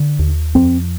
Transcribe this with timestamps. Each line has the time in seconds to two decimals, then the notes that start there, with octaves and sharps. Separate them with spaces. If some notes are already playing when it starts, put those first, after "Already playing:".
Already playing: D3
0.19 D#2
0.55 F2 C4